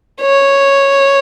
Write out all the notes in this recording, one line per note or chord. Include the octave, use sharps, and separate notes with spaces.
C#5